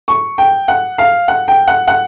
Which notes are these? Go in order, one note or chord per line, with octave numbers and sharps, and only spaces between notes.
C#6
G5
F#5
F5
F#5
G5
F#5
F#5